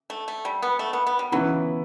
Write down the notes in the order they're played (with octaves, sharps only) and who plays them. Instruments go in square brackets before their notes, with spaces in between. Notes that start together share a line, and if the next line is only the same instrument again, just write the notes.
[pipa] A3
A3
G3
B3
A3
B3
B3
G3
[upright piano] C#3 E3 B3 E4 B4 [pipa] F#3